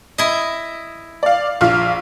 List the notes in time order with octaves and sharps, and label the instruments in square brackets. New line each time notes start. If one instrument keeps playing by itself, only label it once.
[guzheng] E4 D#5
[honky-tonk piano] D5 F5
A#1 F4 F6